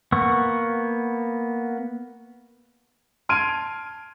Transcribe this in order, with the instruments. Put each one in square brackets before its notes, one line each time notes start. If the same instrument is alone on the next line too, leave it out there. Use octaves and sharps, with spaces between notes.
[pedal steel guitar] A#3 B3 F#5 C#6
[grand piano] A5 C6 F6 G#6 D7 D#7